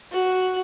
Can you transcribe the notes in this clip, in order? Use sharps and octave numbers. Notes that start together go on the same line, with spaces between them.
F#4